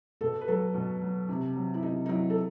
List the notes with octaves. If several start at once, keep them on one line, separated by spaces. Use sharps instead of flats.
B2 A4
B4
F#3 A4
B2
F#3
C3
F#3
E4
C3 D#4
D#4
F#3 E4
A4